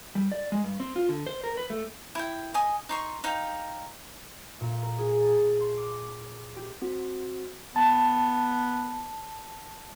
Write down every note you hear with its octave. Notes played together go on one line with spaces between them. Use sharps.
G3
D5
G#3
G2
C4
F4
D3
C5
A#4
B4
A3
E4 G5
D#5 G#5 D#6
D#4 C6 C#6
D#4 F5 G5
A#2
A#4
G#4
A5
C6
D6
G4
C4 F#4
B3 A5